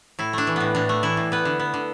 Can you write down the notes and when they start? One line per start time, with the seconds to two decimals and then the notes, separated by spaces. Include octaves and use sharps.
0.19 A2 E4
0.33 A3 D4
0.47 E3
0.56 A2 B3
0.75 A2 D4
0.89 A3
1.03 E3 E4
1.17 A2
1.32 B3 B4
1.45 D3
1.59 B3
1.74 D3